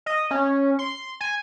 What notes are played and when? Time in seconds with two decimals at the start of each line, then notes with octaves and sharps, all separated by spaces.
0.06 D#5
0.31 C#4
0.79 C6
1.20 G#5